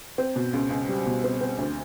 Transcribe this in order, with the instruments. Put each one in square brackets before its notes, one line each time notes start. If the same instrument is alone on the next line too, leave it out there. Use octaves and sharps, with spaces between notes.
[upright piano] C4
B2
C#2
C#2
G3
B2
C4
C4
D2